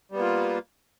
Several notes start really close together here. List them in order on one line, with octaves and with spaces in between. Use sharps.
G3 B3 A#3 F4